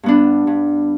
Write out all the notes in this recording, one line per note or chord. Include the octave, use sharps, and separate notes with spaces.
G2 B3 D4
G2